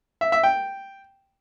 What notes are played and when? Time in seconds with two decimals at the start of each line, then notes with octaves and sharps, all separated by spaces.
0.21 E5
0.32 E5
0.43 G5